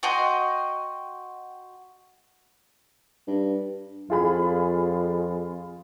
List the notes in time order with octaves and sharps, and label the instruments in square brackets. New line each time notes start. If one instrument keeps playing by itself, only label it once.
[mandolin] F#4 D#5 G5 C6
[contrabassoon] G2
[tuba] F2 [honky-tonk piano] F4 G#4 B5